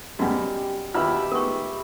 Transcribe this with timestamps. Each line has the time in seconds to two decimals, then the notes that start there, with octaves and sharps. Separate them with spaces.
0.19 F#2 B2 G3 G4
0.94 D#2 B2 F4 G4 E5 B5 F6
1.32 G#3 A3 B3 D#4 A#4 C#6